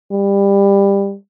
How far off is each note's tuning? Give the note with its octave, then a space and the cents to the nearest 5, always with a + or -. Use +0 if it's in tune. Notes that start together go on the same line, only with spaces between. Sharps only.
G3 +20